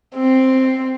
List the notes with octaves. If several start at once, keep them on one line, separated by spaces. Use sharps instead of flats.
C4